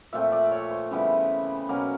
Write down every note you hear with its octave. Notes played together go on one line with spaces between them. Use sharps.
A#2 F3 A3 C4 E5
D5
C#5
C5
C#3 E3 G3 B3
B2 F#3 A#3 C#4